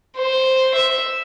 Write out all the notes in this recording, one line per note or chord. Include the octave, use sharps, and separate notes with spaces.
C5
E5